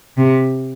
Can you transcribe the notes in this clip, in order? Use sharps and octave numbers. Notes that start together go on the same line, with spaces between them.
C3